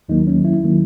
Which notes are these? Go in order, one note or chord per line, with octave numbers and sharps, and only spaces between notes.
D#2 D#3 F#3 A#3 D#4
C#4
E4
D#3 F#3 A#3